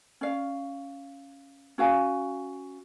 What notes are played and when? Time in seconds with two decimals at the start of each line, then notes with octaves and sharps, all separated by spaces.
0.21 C#4 D5 F5
1.78 C#4 F#4 F5 G#5